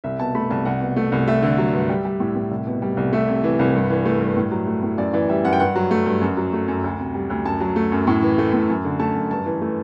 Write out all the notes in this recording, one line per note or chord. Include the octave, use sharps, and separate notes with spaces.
C2 E5
B2 A5
A3 B5
C2 A5
C2 F#5
B2
A3
C2
A3 E5
D3
F#3
G2
G3
G3
A2
A2
C2
B2
G3
C2
A3 E5
C3
E3
C2
G2
E3
A3
G2
A2
F#3
A3
A2
F#2 D5
E3 D5
G3 E5
F#2 F#5
G5
G2 F#5
F#3
A3
G2
F#2
F#3
A3
F#2
D2
C3
G3
D2
F#2 A5
F#3
A3
F#2
A2
E3
A3
A2
F#2
D3
A3 A5
F#2
G2 A5
E3
A3